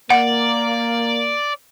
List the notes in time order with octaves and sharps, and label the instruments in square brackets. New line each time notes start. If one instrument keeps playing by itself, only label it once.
[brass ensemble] A#3 [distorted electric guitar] D5 [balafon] F#5